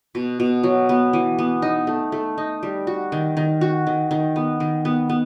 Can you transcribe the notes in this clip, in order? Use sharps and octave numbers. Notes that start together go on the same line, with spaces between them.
B2
B2
F#3
B3
E3
B3
D#4
A3
A3
D#4
G3
F#4
D#3
D#3
F#4
D#3
D#3
B3
D#3
B3
B3